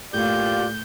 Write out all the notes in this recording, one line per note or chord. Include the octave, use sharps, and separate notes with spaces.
A2 A#3 F4 G4 D5 G6